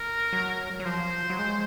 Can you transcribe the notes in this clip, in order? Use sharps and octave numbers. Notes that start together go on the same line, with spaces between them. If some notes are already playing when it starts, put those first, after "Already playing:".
Already playing: A#4
F#3
F#3
F3 C5
F#3
G#3